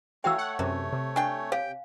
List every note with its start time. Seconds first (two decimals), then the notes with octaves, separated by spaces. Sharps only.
0.24 E3 A3 F#4 C#5 F5 G5 E6
0.38 F#5
0.59 F#2 C3 E3
0.93 C3
1.16 D4 G5 G#5
1.52 G4 C#5 F5 G5